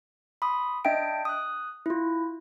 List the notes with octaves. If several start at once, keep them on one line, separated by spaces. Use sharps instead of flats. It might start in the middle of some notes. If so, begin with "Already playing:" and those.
B5 C6 D#6
D4 D#5 E5 G5 D7
D#6 F#6
E4 F4